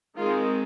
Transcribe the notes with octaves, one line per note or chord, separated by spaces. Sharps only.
D#3 G#3 C4 F4